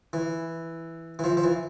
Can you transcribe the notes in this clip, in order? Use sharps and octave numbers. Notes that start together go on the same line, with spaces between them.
E3
E3
F3
F3
E3